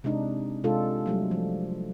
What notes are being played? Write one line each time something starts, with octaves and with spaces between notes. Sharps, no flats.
C3 G#3 D4 D#4
C3 G#3 D4 F4 A4
F#3 G3 A3
F3